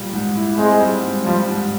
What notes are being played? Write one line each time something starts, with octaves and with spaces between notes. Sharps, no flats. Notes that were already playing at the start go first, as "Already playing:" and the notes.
Already playing: A#2 G3
G#2
E4
G#3 C4
G3
G#2
F3 G3
G#2